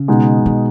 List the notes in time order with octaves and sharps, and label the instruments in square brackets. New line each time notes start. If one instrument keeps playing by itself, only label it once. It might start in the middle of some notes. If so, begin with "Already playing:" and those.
Already playing: [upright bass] C#3
[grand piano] B2 G#3 D#4
[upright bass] D#3